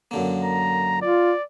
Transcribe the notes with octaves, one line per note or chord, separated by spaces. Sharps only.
F#2 D3 A#3
A#5
F4 D5